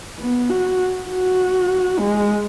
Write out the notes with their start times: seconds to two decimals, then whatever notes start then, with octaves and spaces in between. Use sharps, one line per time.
0.20 B3
0.50 F#4
1.09 F#4
1.99 G#3